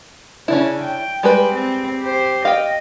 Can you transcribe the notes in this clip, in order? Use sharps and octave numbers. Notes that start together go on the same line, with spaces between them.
C#3 C#4 D4 E4
G5
G3 G#3 B4
C4
G4 C5
D#5 F5 G5